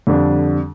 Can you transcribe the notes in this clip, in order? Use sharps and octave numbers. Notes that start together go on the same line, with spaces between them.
F2 D3 G3 D4